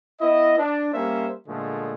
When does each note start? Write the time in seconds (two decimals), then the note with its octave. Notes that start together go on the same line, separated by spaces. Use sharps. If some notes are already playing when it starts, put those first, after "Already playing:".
0.21 B3 E4 D#5
0.59 D4
0.93 G3 A#3 C#4 C5 E5
1.48 A#2 D3 F3 G#3 A3